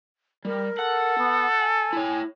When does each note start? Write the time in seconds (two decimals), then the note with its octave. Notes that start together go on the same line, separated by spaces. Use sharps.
0.45 G3 A#4
0.79 A4 F#5
1.18 B3
1.59 G#5
1.93 E4 C#5